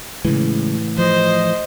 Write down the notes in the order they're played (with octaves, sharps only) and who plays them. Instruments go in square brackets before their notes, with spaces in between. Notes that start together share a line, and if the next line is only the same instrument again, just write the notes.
[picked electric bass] A2 E3 [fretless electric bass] C#3 G#3
[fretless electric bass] F3 [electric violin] C5 [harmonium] D#5